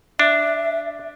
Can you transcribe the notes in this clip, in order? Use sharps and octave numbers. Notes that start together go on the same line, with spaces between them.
D4 E5